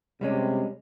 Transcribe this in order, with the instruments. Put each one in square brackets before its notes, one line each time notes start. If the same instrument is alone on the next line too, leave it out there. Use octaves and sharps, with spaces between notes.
[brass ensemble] C3 [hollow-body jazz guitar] G3 G#3 C#4